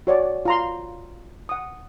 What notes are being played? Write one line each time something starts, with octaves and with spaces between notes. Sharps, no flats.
F#4 C#5 D5
F4 A#5 C6
F#5 D#6